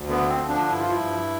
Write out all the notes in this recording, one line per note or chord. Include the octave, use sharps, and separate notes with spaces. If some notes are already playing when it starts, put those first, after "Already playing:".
Already playing: D2
D3 B3
C4
F3
D4
G2 E4
F4
E4
G2